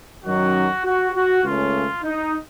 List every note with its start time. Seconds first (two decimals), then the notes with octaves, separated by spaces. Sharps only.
0.24 F#2 D#3 F#3 F#4
0.84 F#4
1.13 F#4
1.43 C#2 C#3 A3 C#4 F4
2.03 D#4